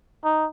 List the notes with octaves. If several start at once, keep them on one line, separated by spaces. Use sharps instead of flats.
D#4